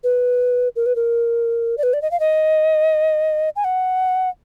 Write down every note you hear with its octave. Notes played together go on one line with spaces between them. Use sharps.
B4
A#4
B4
A#4
D5
B4
D5
D#5
F5
D#5
G#5
F#5